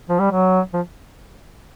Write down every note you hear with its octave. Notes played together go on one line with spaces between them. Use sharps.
F3
G3
F#3
F3